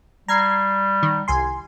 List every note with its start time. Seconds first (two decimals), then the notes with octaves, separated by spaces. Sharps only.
0.28 G3 A#5 G#6 C7
1.03 D#3
1.28 C2 G#5 C6